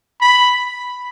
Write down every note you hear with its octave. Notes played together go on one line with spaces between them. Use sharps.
B5